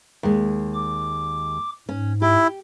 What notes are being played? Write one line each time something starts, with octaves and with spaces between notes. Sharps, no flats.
D#2 G#3
D6
G#2 C#4
E4 G4